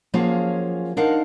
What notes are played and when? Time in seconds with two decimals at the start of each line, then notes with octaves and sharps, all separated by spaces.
0.14 F3 F#3 A#3 C#4 F4 G#4
0.97 D4 D#4 A#4 C5 F5 F#5